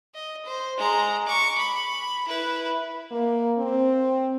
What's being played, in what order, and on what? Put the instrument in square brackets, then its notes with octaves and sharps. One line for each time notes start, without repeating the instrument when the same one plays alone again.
[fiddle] D#5
C5
G#3 A#5
C#6 D6
B5
E4 B4
[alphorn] A#3
C4